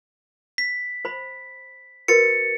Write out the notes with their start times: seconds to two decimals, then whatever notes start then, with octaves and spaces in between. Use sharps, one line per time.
0.58 B6
1.05 C5 B5
2.08 F#4 A#4 B4 A6 C#7